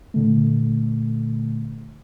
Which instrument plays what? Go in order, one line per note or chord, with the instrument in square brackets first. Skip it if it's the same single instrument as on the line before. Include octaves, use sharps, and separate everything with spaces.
[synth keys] A#2 D3 A3